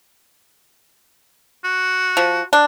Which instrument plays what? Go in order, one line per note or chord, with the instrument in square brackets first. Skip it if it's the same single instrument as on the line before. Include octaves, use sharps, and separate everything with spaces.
[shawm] F#4
[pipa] F3
D4